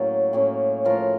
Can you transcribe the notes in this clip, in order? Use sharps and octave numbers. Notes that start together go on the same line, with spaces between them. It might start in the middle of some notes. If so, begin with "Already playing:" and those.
Already playing: A2 F#3 A#3 C#4 A4
A2 F#3 A#3 C#4
A2 F3 A3 A#4